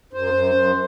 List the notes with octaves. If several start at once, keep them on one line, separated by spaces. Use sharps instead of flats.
F#2 C5
F#2
F#2